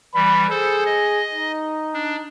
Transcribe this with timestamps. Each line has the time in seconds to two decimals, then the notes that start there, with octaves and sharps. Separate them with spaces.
0.15 E3 G3 B5
0.50 G#4 A4 C5
0.86 D#5
1.33 D#4
1.94 D4